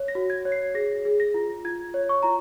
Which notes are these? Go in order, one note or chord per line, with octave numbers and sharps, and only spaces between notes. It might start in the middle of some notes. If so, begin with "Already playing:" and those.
Already playing: C#5
A#6
F#4
G#6
C#5
C7
G#4 A#6
G#4
A#6
F4
F4 G#6
C#5
C#6
F4 A#5